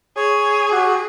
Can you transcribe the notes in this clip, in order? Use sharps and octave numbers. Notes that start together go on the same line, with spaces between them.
G#4 C#5
F#4 G4